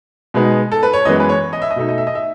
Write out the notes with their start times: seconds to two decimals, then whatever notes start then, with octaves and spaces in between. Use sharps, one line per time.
0.34 B2 G#3 B3 D#4
0.72 A4
0.83 B4
0.93 C#5
1.05 F#2 E3 G#3 B3 D#5
1.20 B4
1.29 C#5
1.53 D#5
1.62 E5
1.71 D#5
1.76 B2 A3 D#4 E5
1.89 D#5
1.98 E5
2.07 D#5
2.15 E5